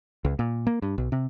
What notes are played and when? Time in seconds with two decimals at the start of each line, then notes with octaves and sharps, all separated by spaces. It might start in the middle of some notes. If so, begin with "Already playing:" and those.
0.25 C#2
0.39 A#2
0.67 A#3
0.82 G2
0.98 B1
1.12 C3